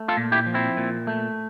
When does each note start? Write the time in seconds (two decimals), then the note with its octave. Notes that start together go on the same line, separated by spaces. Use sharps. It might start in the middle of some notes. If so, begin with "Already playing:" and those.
Already playing: A3
0.08 F4 A4
0.17 A#2
0.32 E4 G4
0.46 F3
0.54 C4 E4
0.77 A#2
1.07 A3